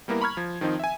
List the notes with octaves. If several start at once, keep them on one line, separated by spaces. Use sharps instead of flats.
G3 A#3 B3 E4 A#4
A#5 B5 C#6 F6 G#6
F3
D#3 F3 C4 D#4
E5 G#5